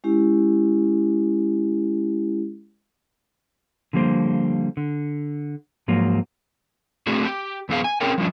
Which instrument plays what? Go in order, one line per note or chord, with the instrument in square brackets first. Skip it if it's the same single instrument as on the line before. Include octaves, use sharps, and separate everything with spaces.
[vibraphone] G#3 C#4 E4 G4
[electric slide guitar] D3 F3 G3 A#3 C5
D3
G#2 F3 F#3 A#3
A3 C4 D4 F#4 G#4
G4
F#2 E3 B3 G#4 F5
G#5
C4 C#4 G#4 A#4 C#5 G5
F3 G3 A3 C#4 D4